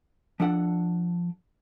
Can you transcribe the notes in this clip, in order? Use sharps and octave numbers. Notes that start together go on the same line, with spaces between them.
F3 D4 A4 F#5